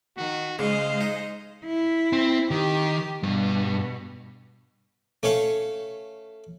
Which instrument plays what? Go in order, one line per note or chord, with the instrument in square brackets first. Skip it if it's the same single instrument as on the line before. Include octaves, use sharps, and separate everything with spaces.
[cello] D#3 [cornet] F#4
[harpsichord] C#3 [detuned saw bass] G#3 [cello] C5 D#5 [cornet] F5
[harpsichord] D#4
[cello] E4
[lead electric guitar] C4
[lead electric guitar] D#3 [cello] G4
[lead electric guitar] G2 [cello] B2
[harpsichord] A3 C#4 C#5 F5